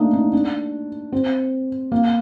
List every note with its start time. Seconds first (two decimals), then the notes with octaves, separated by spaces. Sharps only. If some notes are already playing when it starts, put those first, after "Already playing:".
Already playing: A3 A#3 D4 D#4
0.13 D#4
0.33 D4
1.12 C4
1.92 A#3